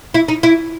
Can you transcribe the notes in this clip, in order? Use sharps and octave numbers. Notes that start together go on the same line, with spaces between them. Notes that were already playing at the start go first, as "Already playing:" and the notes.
E4
D#4
E4